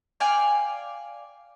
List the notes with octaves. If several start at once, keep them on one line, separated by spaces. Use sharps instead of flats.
D5 F5 G5 G#5